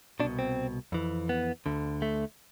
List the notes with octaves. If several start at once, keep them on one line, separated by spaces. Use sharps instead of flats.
C2 B2 D4
C4
F2 E3
B3
D2 D3
A3